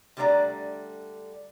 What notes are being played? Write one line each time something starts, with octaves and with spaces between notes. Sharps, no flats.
D3 G3 A3 D4 D5 A#5